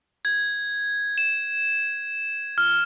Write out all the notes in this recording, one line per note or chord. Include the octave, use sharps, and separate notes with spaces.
G#6
E7
F6